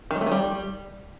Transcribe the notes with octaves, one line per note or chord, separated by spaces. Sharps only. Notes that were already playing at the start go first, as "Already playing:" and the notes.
D#3
G#3
A3
D#3
G3